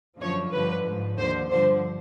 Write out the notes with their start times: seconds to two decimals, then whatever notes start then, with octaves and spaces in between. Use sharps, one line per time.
0.20 F#2 D3 F3 C#5
0.53 G2 D3 F3 B4
0.85 G#2 F3
1.17 D#2 D3 F3 C5
1.50 G2 D3 F3 C5